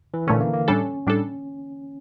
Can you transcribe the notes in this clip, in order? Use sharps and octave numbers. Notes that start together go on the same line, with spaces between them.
E3
A#2 D3 A3 C#4
A#3
A#3
A2 G3 C#4 D4 A4
A2 G3 D4 A4